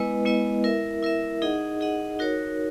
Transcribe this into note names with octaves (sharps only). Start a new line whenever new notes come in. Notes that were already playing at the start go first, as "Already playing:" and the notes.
Already playing: G#3 B3 E4 B4 D#5
G#3 B3 E4 B4 D#5
E4 A#4 E5
E4 A#4 E5
D#4 G#4 D#5 F#5
D#4 G#4 D#5 F#5
D#4 F#4 A#4 C#5